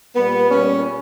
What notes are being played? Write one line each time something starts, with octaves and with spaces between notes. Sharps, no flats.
A#2 G3 B3
A#2 G3 C#4